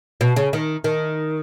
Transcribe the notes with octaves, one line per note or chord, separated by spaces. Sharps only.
B2
C#3
D#3
D#3